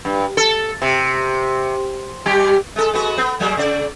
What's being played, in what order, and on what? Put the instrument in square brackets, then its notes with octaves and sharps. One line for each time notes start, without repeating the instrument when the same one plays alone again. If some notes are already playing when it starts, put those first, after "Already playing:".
[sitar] G2
A4
C3
G3 G4
G#3 A4
G#3 B3 F#4
B3
F#3 G#3 A#3
C#3 D5